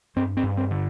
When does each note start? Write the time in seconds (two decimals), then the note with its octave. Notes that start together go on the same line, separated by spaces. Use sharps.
0.16 G2 C4
0.37 C4
0.43 G2
0.57 C4
0.71 D3